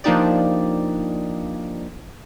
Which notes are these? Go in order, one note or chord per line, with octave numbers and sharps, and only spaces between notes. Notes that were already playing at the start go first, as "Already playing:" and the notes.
F3 A#3 D4 D#4 G4 D5